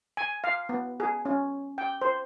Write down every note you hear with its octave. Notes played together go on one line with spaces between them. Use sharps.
G#5
F5
B3
G#4
C#4
G5
C5